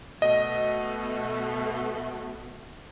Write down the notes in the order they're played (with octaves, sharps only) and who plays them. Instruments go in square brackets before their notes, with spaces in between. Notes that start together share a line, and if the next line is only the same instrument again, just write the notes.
[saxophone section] B2 A3 [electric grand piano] D#5